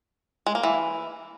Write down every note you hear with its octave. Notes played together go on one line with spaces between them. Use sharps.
G#3
A#3
E3